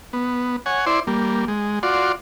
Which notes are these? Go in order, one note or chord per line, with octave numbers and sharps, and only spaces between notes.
B3
C#5 F#5 G#5
E4 C5 D5 C6
G3 A#3
G#3
F4 F#4 D5 C6